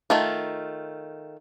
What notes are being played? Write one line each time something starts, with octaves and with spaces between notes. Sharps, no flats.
D#3 A3 F4